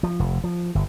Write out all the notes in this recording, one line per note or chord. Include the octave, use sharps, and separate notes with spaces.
F3
F1
F3
G1